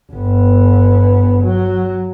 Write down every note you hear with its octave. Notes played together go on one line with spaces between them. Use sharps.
G1 B3
F#3